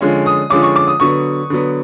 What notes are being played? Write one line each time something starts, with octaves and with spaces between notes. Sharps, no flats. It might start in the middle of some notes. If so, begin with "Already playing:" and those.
D3 F3 G#3 C#4
D#6
D3 F3 G#3 C#4 D6
C#6
D6
D#6
D3 F#3 B3 C#6
D3 F#3 B3